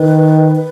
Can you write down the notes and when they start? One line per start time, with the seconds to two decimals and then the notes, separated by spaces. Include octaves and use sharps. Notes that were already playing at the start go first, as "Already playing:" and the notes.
Already playing: D#3 B4
0.55 B4